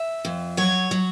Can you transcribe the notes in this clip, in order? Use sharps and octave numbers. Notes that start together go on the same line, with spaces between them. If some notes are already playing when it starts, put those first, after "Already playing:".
Already playing: E5
F2
F#3 C#5
F#3